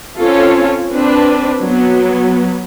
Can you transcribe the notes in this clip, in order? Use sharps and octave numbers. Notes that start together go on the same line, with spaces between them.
C4 C#4 F4 A4 C#5
C4 D4 B4
F#3 B3